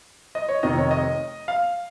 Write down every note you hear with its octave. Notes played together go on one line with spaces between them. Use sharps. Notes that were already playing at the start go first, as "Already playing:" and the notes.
D#5
C#5
F1 F2 C3 D#3 D#5
C#5
D#5
F5